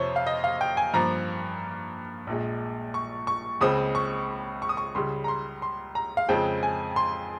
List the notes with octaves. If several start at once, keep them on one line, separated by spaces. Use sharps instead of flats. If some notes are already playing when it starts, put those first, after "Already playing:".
Already playing: F2 C3 F3 A#3 C5 C#5
F5
D#5
F5
G5
G#5
G2 F3 A#3 A#5
A#1 A#2 G#3
C#6
C#6
C#2 C#3 G#3 C4 D#6
C#6
C#6
D#6
C#6
C#2 C#3 G3 C6
A#5
C6
C6
A#5
F5
F2 C#3 G#3 C4 G5
G#5
C6